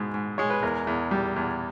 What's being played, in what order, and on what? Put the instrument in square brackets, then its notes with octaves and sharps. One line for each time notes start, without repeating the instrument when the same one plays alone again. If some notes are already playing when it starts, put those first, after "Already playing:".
Already playing: [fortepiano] G#2 B2 G#3
G#2
G#3 C#5
B4
E2 A#4
E2
G3
E2